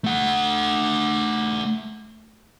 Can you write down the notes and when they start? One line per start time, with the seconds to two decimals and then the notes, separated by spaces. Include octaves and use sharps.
0.04 A3 F#5